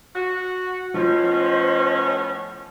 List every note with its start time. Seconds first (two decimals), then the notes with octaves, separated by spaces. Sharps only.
0.15 F#4
0.94 A2 F3 B3 C#4 C5 D#5